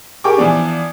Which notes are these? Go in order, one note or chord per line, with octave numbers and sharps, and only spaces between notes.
G4 G#4 A#4 C#6 D6
E3 F3 B3 D4